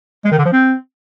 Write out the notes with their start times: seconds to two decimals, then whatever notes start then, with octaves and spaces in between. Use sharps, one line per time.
0.24 G#3
0.31 D#3
0.38 D3
0.45 F3
0.52 C4